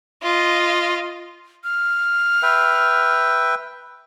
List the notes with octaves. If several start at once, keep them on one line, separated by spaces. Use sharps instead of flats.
F4 D#5
F6
B4 E5 G5